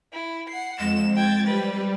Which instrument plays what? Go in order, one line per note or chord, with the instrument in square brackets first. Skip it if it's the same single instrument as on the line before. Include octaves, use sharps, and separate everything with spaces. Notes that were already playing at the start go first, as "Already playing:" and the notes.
[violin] E4
F#5 C7
[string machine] F2 [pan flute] G#3 [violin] E7
[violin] G5 G#6 [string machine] A6
[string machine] G3 [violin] C4 B4